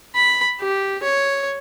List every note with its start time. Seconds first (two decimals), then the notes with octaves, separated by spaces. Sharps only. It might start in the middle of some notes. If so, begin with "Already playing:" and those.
0.16 B5
0.61 G4
1.03 C#5